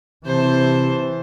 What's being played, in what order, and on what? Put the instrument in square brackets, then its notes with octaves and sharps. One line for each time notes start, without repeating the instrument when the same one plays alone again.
[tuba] C3 [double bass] E3 [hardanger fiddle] C5 A5